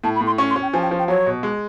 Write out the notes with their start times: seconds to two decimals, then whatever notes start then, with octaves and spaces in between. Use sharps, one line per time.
0.04 A2 A5
0.16 B5
0.21 A2
0.27 C6
0.38 C#4 C#6
0.50 C6
0.56 C#4
0.62 G5
0.73 F3 G#5
0.83 G5
0.91 F3
0.99 G5
1.08 F#3 C#5
1.26 B2
1.43 G#3